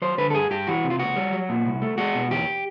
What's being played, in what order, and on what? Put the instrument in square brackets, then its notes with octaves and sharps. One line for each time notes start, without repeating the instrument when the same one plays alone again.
[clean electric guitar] F#3 C5
D3 B4
A4
G2 G#4
G2 G4
E3 F#4
C3
F4
C#2 F#4
G3
F#3
A#2
C2
A3
G#3 F#4
B2
E2 G4